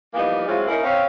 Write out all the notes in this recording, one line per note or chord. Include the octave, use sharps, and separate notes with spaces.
E3 F3 G3 A#3 B3 D#4
F#3 G#3 C4 E4 F4
A#3 C#4 D#4 E4 A#4
C4 C#4 F5